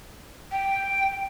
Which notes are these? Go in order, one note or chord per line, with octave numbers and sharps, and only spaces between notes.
G5